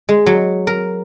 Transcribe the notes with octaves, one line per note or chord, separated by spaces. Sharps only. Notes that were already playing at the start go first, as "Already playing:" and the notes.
G#3
F#3
A#4